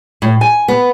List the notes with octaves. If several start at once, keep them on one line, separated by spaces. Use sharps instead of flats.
A2
G#5
B3